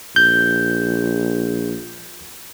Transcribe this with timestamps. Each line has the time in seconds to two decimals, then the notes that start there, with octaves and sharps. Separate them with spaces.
0.16 A#1 G6